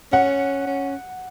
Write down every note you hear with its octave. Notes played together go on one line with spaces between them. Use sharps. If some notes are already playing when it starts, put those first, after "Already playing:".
C#4 F#5
C#4